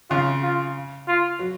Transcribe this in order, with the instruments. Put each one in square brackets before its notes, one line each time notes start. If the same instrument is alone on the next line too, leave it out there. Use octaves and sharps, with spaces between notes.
[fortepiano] C#3 [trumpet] F4
[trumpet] F4
F4
[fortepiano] F#3